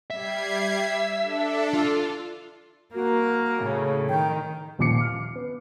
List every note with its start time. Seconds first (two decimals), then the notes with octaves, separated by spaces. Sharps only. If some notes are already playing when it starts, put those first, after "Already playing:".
0.10 G3 E5 G#6 C7
1.20 D4 A4
1.74 F4
2.95 A#3 F#4 A#4
3.63 A2 C#3
4.09 D#3 G5
4.79 D#2 A#2 F3 D6 C7 C#7
4.98 D6 F6
5.35 B3